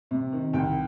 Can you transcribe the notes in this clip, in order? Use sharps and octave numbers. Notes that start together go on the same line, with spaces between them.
C3
D#3
C2 G5